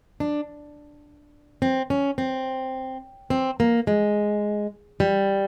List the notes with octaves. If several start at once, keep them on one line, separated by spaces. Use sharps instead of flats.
D4
C4
C#4
C4
C4
A#3
G#3
G3